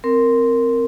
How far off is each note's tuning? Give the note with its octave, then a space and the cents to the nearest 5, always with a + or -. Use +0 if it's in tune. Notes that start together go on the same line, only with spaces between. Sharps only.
C4 -5 A#4 -10